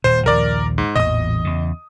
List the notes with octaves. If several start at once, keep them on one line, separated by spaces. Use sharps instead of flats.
D#1 A#2 C5
A#1 D#2 F3 A#4 D5
G#2
A1 E2 A#2 D#5 D#6
E2 C#3